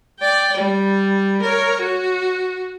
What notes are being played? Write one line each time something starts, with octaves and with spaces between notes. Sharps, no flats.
D5 G5
G3
A#4 C#5
F#4